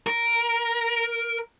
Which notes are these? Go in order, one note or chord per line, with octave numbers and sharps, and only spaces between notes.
A#4